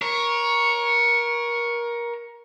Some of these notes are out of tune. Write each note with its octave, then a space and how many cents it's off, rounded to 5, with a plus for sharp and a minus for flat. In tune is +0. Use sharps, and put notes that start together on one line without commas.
A#4 +25 C#5 +0